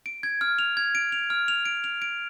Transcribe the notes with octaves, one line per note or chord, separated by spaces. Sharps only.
D7
G#6
F6
F7
G#6
D7
F7
F6
F7
D7
F7
D7